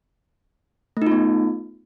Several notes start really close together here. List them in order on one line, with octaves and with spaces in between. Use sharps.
A3 D#4 F4 B3